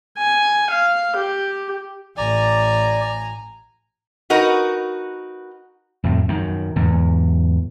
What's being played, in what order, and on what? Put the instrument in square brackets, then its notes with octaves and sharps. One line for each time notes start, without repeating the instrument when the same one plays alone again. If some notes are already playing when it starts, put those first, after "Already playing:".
[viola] G#5
F5
G4
[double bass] A1 [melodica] D5 [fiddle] G#5 A#5
[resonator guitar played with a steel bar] D#4 F#4 A#4 B4
[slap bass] F2 A2
F#2 D#3
E2 G#2